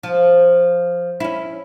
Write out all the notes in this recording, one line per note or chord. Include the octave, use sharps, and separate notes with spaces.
F3
C#4 E4